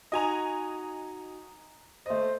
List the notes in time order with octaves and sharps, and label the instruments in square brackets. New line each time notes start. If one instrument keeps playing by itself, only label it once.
[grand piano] D#4 F#4 [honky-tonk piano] D#5 G#5 A#5
[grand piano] A3 D#5 [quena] C5